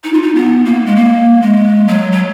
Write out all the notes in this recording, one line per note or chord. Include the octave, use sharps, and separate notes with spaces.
D#4
F4
D#4
B3
A#3
G#3
A#3
G#3
F#3
F#3